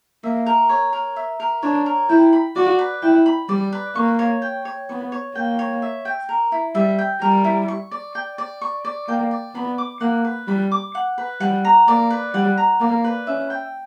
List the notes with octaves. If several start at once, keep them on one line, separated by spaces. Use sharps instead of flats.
A#3 E5
A#4
C#5
A#4
E5
A#4
D4 C#5
A#4
E4 G5
B5
F#4 D5
B4
E4 G5
B5
G3 D5
B4
A#3 C#6
C#5
G5
C#5
B3 C#6
C#5
A#3 G5
C#5
E5
G5
A#4
E4
G3 E5
G5
G3 A#4
E4
C#6
D5
G5
D5
C#6
D5
A#3 G5
D5
B3 B5
D6
A#3 F#5
B4
G3 B5
D6
F#5
B4
G3 F#5
A#5
A#3 D5
B4
G3 F#5
A#5
A#3 D5
B4
C#4 E5
G5